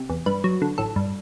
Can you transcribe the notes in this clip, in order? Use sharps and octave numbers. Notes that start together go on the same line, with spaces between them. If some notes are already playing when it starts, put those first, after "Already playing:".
Already playing: C3
E2
G2 B4
F#3
D3
A1 A4
G2